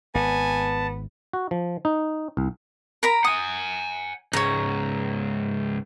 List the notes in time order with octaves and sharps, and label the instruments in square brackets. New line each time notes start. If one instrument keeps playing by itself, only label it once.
[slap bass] G#1 [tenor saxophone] B3 [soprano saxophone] G#5 [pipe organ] A5
[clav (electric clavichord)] F#4
F3
D#4
C2
[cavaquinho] A#4 A#5 B5
[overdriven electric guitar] F#5 G#5 [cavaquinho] D#6
[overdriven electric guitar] C#2 G#2 [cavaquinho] C#5 A#5